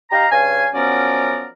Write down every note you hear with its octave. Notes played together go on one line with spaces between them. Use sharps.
D#4 G4 F5 A#5
G2 C#3 F5 G#5
F3 F#3 B3 C#4 A#4 D5